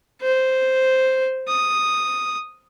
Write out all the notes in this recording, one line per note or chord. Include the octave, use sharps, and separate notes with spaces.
C5
D#6